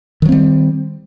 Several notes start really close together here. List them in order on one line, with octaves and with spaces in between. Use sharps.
D#3 F#3 C4 G3